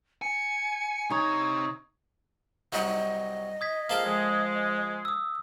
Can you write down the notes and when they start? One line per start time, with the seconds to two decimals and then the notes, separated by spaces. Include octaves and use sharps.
0.22 G#5 C#7
1.10 C3 D#4 C#5 A#5 G#6
2.73 C2 F#3 D#5
3.61 D#6 G#6 B6
3.90 F3 A#3 G#4 A4 F5 G5
4.05 F3 G#3
5.05 D#6 E6